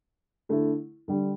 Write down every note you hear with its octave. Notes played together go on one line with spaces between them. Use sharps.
D3 A3 E4
D3 G3 D4